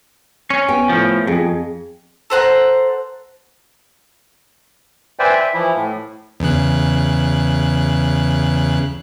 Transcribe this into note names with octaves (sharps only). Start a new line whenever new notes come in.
C#4
B3 G5 G#5
A2 F3
F2 G#4
A4 C5 F#5 A#5
B4 C5 D5 E5 G5 G#5
E5
E3 F3 E4
A2
E2 C#3 F#6